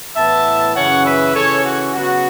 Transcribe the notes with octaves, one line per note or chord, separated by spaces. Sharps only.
A2 E3 B3 E5 A5
F#2 C#3 E3 C#4 C#5 F#5
B4 E5
C#3 E3 C#4 A4 C#5
F#4
C#3 F#3 B3 F#4